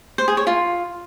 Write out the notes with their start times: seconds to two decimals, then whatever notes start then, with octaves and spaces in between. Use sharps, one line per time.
0.18 C5
0.28 G#4
0.37 C#5
0.47 F4